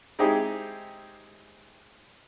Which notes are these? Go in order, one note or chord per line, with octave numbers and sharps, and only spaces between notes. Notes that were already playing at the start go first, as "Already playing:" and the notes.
G#3 C4 D#4 E4 G4 G#4